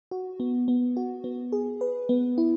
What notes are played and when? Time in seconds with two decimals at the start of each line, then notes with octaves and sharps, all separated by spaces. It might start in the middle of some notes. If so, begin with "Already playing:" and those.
0.11 F#4
0.40 B3
0.68 B3
0.97 F#4
1.24 B3
1.52 G#4
1.81 B4
2.09 B3
2.38 E4